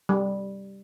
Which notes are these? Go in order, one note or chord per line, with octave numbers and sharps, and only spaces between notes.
G3